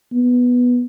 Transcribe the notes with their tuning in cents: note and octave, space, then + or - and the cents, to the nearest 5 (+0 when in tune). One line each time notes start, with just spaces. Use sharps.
B3 -5